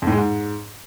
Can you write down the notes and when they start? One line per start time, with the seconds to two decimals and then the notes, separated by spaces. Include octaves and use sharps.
0.02 F2
0.07 A2
0.12 G#3
0.17 G#2